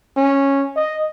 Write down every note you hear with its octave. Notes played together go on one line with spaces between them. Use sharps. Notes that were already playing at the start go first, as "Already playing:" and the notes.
C#4
D#5